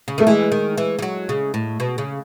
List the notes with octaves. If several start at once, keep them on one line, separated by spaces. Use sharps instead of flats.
C#3
D#3 A3
E3 G#3
D#3
E3
E3
F#3
C#3
A2
B2
C#3